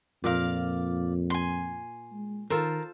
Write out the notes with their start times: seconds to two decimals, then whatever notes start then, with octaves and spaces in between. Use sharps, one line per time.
0.24 F2 A#2 A#4 D5 F5
1.30 G#5 C6
2.12 G#3
2.50 D#3 F4 A4 A#4 C5